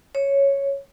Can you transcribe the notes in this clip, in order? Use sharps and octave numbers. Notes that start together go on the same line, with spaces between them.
C#5